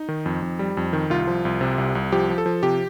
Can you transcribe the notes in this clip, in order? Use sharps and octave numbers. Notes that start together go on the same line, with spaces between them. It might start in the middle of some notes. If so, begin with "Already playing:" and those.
Already playing: D#4
D#3
F2
F2
G3
F2
D#3
C2 F4
F3
C2
C3
C2
C2
F3 G4
F3
A4
F3
C3 G4